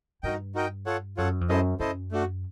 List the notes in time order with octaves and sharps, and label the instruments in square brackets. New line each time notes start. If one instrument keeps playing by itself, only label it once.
[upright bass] G2 [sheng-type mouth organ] D#4 F#4 A#4 D#5 G5
[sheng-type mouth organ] D#4 F#4 A#4 D#5 G5
F4 A4 C#5 F#5
[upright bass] F#2 [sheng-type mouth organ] F4 A4 C#5 F#5
[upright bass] F2
[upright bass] F#2 [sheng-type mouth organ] E4 A4 C5 D#5
[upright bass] F#2 [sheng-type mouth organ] E4 A4 C5 D#5
[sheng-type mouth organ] A3 D4 F#4